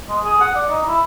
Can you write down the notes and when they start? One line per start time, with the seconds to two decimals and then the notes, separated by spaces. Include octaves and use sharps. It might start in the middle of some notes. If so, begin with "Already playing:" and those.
0.09 G#3
0.24 G#4
0.40 F#5
0.55 D5
0.69 D#4
0.87 E4